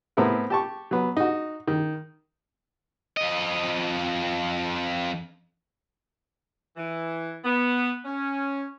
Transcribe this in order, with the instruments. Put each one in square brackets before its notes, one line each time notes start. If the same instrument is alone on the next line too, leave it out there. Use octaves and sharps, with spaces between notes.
[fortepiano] A2 B3 C4 E4 A#4
G4 A5 C#6
F#3 B3
D#4 F#4
D#3
[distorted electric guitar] F2 D#5
[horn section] E3
B3
C#4